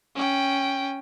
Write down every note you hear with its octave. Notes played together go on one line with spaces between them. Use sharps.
C#4 G5